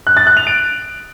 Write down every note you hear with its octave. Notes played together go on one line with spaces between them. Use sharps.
F#6
A6
F#6
F7
D7